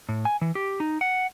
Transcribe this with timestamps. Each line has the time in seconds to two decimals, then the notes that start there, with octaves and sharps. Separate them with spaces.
0.09 A2
0.25 G#5
0.42 E3
0.55 G4
0.80 D#4
1.01 F#5